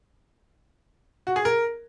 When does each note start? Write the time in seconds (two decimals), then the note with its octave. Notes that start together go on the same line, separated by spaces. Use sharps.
1.27 F#4
1.36 G#4
1.45 A#4